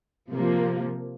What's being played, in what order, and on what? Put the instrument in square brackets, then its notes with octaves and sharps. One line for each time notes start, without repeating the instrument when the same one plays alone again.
[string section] C3 F3 A#3